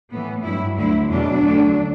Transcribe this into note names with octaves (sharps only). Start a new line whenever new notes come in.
A2 E3 B3
G2 F#3 E4
D2 D3 F#3 E4
E2 B2 F#3 D4
D2 D3 F#3